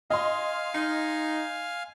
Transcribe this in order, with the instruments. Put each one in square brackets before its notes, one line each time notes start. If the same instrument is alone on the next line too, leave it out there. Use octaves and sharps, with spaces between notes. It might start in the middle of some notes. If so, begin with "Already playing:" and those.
[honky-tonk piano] D#5 C6 [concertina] F5 G#5 F6
[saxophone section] D#4